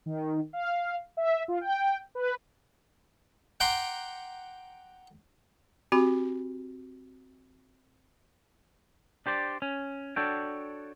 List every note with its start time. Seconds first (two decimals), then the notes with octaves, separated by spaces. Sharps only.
0.06 D#3
0.53 F5
1.17 E5
1.48 F4
1.61 G5
2.15 B4
3.60 F#5 G5 A#5 C6 D6
5.92 C4 F#4 G4 B5
9.26 D4 G4 C5 D5
9.62 C#4
10.16 D4 F#4 A4 C#5 G5